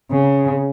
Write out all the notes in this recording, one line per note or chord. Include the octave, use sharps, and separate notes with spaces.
C#3